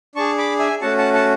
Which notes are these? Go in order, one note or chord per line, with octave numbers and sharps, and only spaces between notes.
D4 G#4 A5 C#6
B5 D6
E5 G#5
A3 C#4 F#4 F#5 A5
F#5 A5
F#5 A5